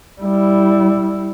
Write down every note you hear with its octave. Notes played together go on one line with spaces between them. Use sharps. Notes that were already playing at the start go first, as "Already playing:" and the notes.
G3 E4